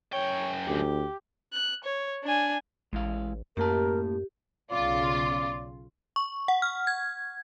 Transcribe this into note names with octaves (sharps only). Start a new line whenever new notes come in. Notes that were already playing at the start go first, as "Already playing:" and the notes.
F#2 C#5 G5
D2 G4
F#6
C#5
D4 G#5
A1 G#3 E4 F5
F#2 A2 A#3 G4 A#4 A5
B1 C#3 F4 D5
C#6
F#5
F6
G#6